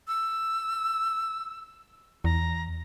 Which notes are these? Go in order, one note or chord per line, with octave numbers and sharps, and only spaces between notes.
E6
E2 A#5